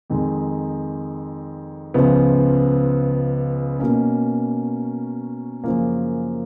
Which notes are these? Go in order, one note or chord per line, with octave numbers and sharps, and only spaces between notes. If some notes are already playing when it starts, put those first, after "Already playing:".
F2 D#3 G#3 D#4
C#2 C#3 F3 B3
B2 A#3 C#4
F#2 C#3 F3 A#3